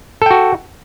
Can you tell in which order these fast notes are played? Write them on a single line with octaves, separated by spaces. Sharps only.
A4 G5 F#4